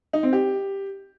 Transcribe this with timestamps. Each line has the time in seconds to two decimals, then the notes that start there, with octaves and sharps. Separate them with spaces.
0.13 D#4
0.23 C4
0.33 G4